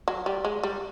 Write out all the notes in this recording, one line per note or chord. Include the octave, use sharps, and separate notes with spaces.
F#3
G3
G#3
G3